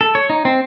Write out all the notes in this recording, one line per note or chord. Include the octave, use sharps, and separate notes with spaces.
A4
C#5
D#4
C4